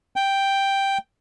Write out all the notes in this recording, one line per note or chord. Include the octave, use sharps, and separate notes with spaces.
G5